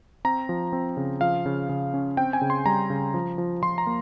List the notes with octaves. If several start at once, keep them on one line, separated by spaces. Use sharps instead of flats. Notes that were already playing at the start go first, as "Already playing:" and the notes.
C4 A#5
F3
C4
C#3
F3 F5
C#3
C#3
C#4
C4 G5
G#5
C#3
C6
G3 A#5
C#3
F3
F3
F3 C6
A#5
A#3